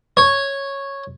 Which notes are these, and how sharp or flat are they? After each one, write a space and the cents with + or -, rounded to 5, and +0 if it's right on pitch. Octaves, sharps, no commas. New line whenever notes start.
C#5 -5